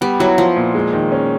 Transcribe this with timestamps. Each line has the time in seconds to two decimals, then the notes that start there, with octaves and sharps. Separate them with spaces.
0.01 G3 B3
0.20 F#3 E4
0.38 F3 E4
0.56 A#2
0.75 G#3
0.93 D#3
1.12 C#4